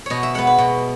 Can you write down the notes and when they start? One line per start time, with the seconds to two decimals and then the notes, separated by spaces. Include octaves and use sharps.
0.06 B2 C#5 D#5
0.23 E5
0.34 G#3 B3 F#5
0.47 B4
0.58 B2